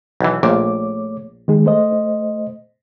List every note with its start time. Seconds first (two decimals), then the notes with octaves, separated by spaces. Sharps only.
0.21 B1 E3
0.43 A#1 A#2 A3 C#5 D6
1.48 D#3 G#3 G#4
1.66 A3 C5 D#5